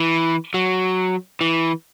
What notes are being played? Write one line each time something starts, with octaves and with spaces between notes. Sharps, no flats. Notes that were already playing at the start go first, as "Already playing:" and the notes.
Already playing: E3
F#3
E3